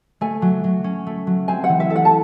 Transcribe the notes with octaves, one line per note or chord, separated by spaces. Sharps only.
A3 G#5
F#3
F#3
C#4
A3
F#3
C4 G#5
F#5
E3
E5
A4
F#5
A5